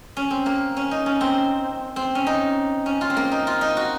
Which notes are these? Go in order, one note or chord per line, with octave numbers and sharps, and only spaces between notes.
C#4
C4
A#3
C#4
D#4
C#4
C4
C4
C#4
D#4
C#4
F4
C4
A#3
D#4
F4
D#4
F#4